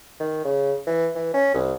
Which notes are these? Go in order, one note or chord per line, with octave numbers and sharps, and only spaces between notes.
D#3
C#3
E3
E3
C#4
C2